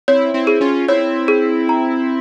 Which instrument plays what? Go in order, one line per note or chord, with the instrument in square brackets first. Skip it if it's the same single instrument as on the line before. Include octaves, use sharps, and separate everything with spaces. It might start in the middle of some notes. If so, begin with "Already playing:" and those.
[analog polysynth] C4 E4 [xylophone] C#5
[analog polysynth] C4 E4
[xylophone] G#4
[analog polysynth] C#4 F4
[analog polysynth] C4 E4 [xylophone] C#5
[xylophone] G#4
A#5